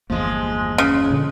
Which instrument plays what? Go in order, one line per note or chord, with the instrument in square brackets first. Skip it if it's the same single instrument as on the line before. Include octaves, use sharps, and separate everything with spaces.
[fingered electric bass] G1 E2 G2 [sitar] F3 G#3 [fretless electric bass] A#3
[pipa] C#3
[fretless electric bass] A#2 D3